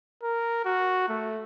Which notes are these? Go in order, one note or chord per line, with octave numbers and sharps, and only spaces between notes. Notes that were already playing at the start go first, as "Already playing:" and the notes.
A#4
F#4
A3